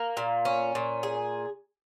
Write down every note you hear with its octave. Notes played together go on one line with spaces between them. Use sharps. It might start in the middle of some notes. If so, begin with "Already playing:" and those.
Already playing: A#3
A#2
C#4
A#2
G#4